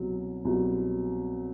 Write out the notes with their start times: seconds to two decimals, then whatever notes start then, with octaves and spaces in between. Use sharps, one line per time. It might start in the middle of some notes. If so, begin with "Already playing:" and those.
Already playing: C2 B2 F#3
0.45 C2 B2 F#3